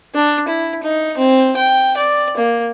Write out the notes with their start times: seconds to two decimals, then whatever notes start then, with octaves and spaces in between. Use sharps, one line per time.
0.15 D4
0.48 E4
0.83 D#4
1.17 C4
1.57 G5
1.97 D5
2.37 A#3